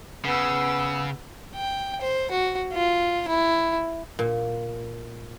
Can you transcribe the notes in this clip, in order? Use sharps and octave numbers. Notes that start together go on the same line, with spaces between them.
C#3 B3 E6
G5
C5
F#4
F4
E4
A#2